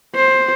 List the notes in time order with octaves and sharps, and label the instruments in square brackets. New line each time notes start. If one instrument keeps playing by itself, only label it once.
[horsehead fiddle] C5